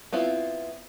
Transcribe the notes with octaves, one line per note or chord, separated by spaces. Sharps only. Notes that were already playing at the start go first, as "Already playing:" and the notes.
B3 C4 E4 F4